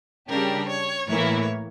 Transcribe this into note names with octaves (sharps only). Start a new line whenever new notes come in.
C#3 G3 D4 G4 A#4
C#5
A2 E3 A#3 E4 A#4 C#5